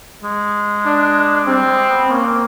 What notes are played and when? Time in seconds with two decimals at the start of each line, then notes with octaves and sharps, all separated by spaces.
0.23 G#3
0.86 D4
1.47 G3 C4
1.68 G#3
1.89 B3
2.10 A#3 C#4
2.25 C4